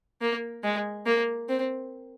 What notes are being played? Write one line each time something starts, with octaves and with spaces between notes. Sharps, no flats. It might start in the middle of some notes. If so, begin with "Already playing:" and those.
A#3
G#3
A#3
C4